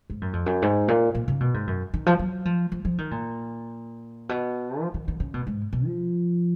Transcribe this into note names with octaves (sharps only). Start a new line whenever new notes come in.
G#2
F#2
F2
F#2
G#2
A#2
A#2
C#3
B2
G#2
F#2
D#3
F3
F#3
F3
F3
F3
D#3
A#2
B2
F3
D#3
D#3
C#3
B2
G#2
B2
F3